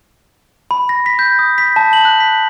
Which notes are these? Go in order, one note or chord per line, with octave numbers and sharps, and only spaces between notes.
B5
A#6
B6
G6
D#6
B6
A5
F#7
F#6
B6